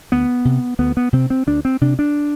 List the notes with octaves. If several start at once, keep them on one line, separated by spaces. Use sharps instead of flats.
D2 B3
C3
D2 B3
B3
C3 C4
C4
D2 D4
C4
C3 D4
D4